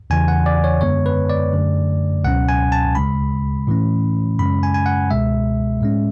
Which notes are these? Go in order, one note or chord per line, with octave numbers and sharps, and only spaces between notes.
E2 C#3 E3 G#5
F#5
D5
C#5
F#2 D3 G#3 B3 C#5
B4
D5
F#2 D3 A3
C#2 B2 F#3 C#4 F#5
G#5
A5
D2 C#3 G#3 B5
A2 E3 A3 C#4
F#2 C#3 G#3 C#4 B5
G#5
G#5
F#5
C#2 B2 G#3 E5
A2 G#3 C#4